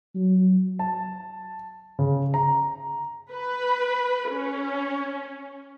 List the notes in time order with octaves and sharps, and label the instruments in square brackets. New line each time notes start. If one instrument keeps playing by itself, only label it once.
[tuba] F#3
[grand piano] A5
C#3
A#5
[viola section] B4
C#4